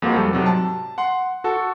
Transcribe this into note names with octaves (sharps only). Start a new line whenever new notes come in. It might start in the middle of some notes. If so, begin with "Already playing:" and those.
F2 G#3 A#3 F#4 C5
G3 A4
G#2 C3 F#3
A5
F#5 C6
F#4 A4